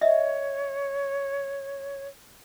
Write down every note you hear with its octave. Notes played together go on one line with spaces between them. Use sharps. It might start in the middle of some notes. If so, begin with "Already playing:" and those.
C#5 D#5 E5